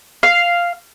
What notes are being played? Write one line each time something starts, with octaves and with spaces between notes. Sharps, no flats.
F5